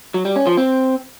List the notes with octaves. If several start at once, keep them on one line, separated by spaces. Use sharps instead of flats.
F#3
G3
C#4
F3
C4